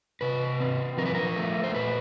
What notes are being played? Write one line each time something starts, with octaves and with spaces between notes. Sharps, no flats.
C3 B4
C4
F3 A#4
B4
A#4
A3
C5
A#2 B4